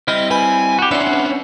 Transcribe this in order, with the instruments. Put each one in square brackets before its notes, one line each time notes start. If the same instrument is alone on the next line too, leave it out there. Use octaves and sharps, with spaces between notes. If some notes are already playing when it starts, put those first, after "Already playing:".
[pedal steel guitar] G3 C4 E4 [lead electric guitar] D#5 [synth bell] F6
[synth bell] B4 B5 G6 [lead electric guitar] G#5
[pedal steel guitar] F#4 G4
[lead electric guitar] C#4 D4 [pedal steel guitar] B4 F#5 C6 [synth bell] D5 E5 E6